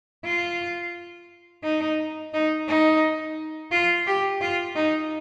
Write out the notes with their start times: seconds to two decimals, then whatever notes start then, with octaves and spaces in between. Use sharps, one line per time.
0.25 F4
1.63 D#4
2.33 D#4
2.68 D#4
3.72 F4
4.07 G4
4.41 F4
4.76 D#4